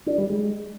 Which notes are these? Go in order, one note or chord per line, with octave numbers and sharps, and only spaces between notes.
D4
G3
G#3